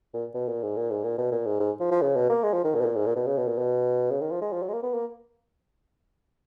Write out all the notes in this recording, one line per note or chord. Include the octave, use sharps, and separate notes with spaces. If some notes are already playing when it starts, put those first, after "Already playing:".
A#2
B2
A#2
G#2
A#2
G#2
A#2
B2
A#2
G#2
G#2
F3
F3
C#3
B2
A#3
G#3
F3
D#3
A#2
B2
A#2
G#2
A#2
B2
C#3
B2
A#2
B2
C#3
D#3
F3
G#3
F3
F#3
G#3
A#3
B3
A#3